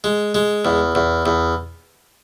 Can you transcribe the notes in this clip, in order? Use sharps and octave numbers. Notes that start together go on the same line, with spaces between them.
G#3
G#3
E2
E2
E2